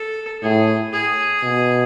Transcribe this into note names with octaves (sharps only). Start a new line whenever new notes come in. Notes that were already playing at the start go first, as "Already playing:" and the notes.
Already playing: A4
A2 G#4
G#4
B2